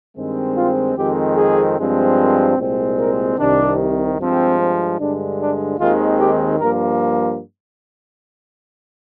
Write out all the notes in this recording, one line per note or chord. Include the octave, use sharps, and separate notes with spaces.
G2 D#3 G#3 C4
F4
F2 D#3 G#3 C4 G4
G#4
G2 F3 G#3 C4
A#4
C2 A#2 G#3 C4
A#4
C2 C3 D#3 D4
G2 F3 G#3 C4
C4
G2 D3 G#3 D4
D4
D#2 D#3 G#3 C4 F4
G4
G2 F3 A#3 A#4